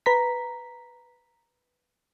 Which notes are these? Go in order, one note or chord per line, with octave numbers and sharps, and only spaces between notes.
B4 A#5 B6